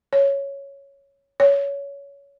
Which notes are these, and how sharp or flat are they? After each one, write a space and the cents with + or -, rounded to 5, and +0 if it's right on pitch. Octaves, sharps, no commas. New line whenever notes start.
C#5 +0
C#5 +20